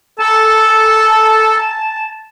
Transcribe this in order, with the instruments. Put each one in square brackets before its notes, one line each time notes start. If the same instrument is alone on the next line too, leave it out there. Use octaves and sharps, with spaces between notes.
[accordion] A4 [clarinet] A5